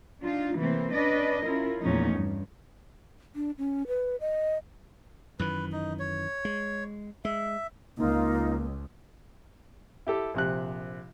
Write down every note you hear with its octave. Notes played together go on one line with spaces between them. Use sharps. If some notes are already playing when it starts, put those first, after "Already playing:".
D4 D#4 F4
C3 E3 A3 A#3 C4
C#4 D4 B4 D5 D#5
C#4 E4 F4 A#4
E2 A#2 F3 A3 C#4 D#4
G2
D4
C#4
B4
D#5
F#2 D#3 E3 B4
D#4
C#5
G#3
G#3 E5
C#2 A#3 D#4 F4
E4 G4 A4
A#1 C3 F#6